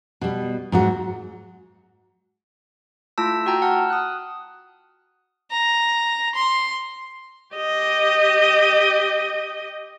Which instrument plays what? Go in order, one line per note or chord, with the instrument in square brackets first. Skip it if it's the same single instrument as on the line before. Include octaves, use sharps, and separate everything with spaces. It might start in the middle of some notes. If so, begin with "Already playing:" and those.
[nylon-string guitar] B2 G3
G#2 F#3 F#4
[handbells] A3 E4 F4 A5 E6
F#4 G5 A#5 G6
F#5 A5 F6
D#6 F#6
[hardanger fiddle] A#5
C6
[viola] G4 D#5